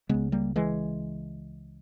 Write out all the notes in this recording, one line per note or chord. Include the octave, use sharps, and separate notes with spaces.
C#2 C#3 G#3 B3
G3 A#3
E3 G#3